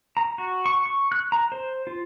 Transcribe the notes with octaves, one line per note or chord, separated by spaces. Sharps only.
A#5
F#4
C#6
C#6
F#6
A#5
C5
F4